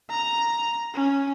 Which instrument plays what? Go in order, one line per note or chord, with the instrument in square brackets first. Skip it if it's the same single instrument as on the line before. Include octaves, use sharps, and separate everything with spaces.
[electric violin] A#5
C#4